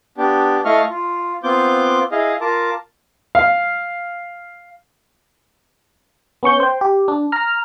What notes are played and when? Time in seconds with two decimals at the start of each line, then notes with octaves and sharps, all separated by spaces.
0.18 B3 D4 G4
0.65 A3 E4 D#5 F5 C#6 F6
0.90 F4
1.43 B3 C4 F4 D6 G6
2.12 E4 G#4 D#5 F5
2.41 F4 A#4 A5 D6
3.35 F5
6.43 B3 C#4 C#6 G6
6.60 C5 G5
6.81 G4
7.08 D4
7.32 A#5 F6